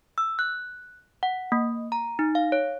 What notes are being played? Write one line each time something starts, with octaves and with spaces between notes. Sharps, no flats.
E6
F#6
F#5
A#3
A#5
D#4
F5
C#5